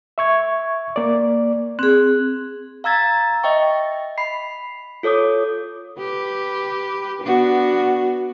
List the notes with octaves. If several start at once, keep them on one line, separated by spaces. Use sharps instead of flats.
E5 C#6 G#6
A#3 D5
C4 G#4 F#6
F5 A#5 E6 G#6 A6
D#5 E5 G5 C#6
B5 C7
F4 A4 C#5 D6 D#6
G4 B4
B3 D4 F#4